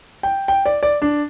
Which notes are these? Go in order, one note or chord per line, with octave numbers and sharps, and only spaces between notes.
G5
G5
D5
D5
D4